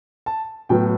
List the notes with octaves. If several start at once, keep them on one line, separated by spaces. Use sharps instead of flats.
A5
A2 F#3 B3 G5